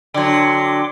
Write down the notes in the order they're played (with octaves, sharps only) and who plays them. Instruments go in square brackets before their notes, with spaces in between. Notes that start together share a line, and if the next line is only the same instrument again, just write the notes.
[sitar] D3 F#3 [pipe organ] G5 C6 D6